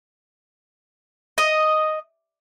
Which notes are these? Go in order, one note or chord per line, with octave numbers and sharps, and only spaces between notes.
D#5